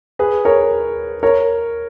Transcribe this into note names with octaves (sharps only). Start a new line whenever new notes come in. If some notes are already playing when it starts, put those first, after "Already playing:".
G#4 B4
A#4 C#5
A#4 C#5